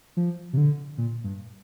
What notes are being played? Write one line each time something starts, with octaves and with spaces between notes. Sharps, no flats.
F3
C3
D3
A#2
G2